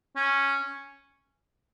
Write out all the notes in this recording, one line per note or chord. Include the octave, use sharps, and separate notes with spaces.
C#4